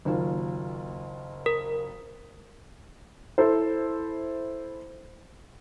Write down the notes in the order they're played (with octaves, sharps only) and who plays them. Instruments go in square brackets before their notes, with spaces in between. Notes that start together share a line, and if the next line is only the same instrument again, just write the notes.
[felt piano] F#1 D#2 F4
[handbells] A#4
[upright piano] E4 A4 C5